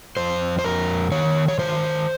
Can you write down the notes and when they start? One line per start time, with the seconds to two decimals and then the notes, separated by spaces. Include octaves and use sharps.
0.17 F2 C5
0.59 C5
0.64 F2 A#4
1.11 D#3 C#5
1.48 C#5
1.58 D#3 C5